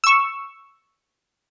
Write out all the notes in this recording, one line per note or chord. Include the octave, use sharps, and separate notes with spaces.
C#6 E6